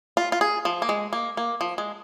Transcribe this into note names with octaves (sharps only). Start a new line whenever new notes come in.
F4
F4
G#4
F3
A#3
G#3
A#3
A#3
F3
G#3